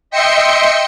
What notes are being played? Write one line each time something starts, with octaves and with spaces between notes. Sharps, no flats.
D#5 E5 G5 C6 C#7